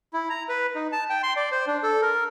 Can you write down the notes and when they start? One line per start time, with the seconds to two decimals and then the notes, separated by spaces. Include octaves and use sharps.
0.13 E4
0.30 A#5
0.49 B4
0.75 D#4
0.92 A5
1.10 G5
1.23 C6
1.36 D5
1.52 C5
1.67 D4
1.83 A4
2.02 A#4